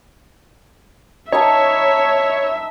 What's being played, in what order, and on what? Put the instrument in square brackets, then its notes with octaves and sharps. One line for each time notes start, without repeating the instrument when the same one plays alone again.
[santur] D#4 B4 A5 [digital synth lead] C#5 [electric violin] E5